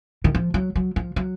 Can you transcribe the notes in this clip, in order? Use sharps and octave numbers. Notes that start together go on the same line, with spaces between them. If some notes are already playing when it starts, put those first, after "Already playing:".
D#3
F3
F#3
F#3
F3
F#3